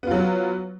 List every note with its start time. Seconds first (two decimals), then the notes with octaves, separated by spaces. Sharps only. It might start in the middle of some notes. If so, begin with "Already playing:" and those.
0.03 B3
0.07 F4
0.11 F#3